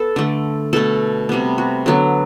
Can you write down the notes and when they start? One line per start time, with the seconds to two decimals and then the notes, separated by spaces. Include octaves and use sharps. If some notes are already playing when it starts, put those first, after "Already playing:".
Already playing: B3 A4
0.16 D3 A3
0.73 B2 A3 A4
1.29 C3 G3 B3
1.58 F#4
1.86 D3 F#3 B3